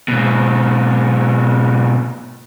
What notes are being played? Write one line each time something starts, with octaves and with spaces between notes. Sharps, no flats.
G#2 B2